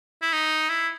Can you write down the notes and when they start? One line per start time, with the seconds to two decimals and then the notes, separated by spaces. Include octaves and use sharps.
0.22 E4
0.33 D#4
0.69 E4